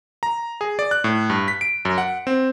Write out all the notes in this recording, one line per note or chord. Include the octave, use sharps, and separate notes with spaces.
A#5
G#4
D5
F#6
A2
G2
B6
D7
F#2
F#5
C4